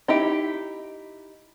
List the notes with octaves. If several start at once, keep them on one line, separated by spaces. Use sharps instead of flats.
D#4 E4 G4